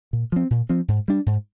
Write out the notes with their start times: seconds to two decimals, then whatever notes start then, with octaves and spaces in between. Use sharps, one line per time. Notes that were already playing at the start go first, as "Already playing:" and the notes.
0.13 A#2
0.32 F3 C4
0.51 A#2
0.69 F3 C4
0.88 G#2
1.08 G3 D4
1.26 G#2